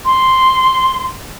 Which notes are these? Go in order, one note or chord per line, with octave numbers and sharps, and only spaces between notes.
C6